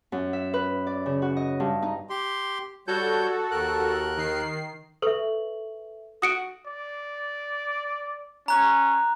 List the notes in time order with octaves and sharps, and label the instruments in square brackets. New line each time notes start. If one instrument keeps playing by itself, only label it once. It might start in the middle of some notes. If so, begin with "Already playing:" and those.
[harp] F#2
E5
B4
D5
C#3
F#4
D#5
G2
D#4
[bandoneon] G4 C6
[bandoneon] G3 C#5 G6 [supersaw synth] F#4 A4
[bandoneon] D#2 A#4 F#6
[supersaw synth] D#3 C7
[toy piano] A4 B4 C#6 [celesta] E5 F#7
[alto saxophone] F#4 [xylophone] D#6 C#7 D7
[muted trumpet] D5
[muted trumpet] C#4 [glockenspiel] A#5 F#6